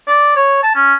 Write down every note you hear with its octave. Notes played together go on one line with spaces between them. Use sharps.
D5
C#5
A5
C#4